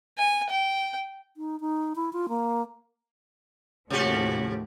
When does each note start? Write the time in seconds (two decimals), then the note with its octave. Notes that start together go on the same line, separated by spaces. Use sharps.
0.18 G#5
0.49 G5
1.37 D#4
1.60 D#4
1.96 E4
2.13 F4
2.29 A#3
3.90 D#2 A2 C3 F3 C#4 F#4 G4